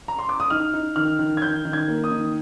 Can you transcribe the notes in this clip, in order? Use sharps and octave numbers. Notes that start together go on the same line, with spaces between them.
A#5
C6
D6
D#6
D#4 F6
D#4
D#3 F6
D#3
G#6
D#3 G6
D#3
G#6
A#3
D#6
D#3